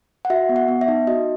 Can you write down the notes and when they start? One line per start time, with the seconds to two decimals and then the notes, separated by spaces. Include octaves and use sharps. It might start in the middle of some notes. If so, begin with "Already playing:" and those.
0.25 F#5
0.30 F#4 E5
0.49 B3
0.56 F#5
0.68 B3
0.81 E5
0.88 D#4
1.07 F#4 D#5